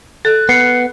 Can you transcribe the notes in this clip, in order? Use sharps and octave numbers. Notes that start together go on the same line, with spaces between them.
A4 F#6
B3 C7 C#7